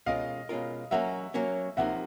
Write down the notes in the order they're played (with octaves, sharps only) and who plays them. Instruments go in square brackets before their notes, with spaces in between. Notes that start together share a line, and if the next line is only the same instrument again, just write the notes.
[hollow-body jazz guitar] B2 G#3 C#4 F4 A#4 [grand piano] D#5 F5
[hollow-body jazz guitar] B2 G#3 C#4 F4 A#4
[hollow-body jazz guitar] F#3 A#3 C#4 [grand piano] E5 F#5
[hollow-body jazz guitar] F#3 A#3 C#4
[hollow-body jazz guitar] C2 C3 F3 A#3 D#4 [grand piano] E5 F#5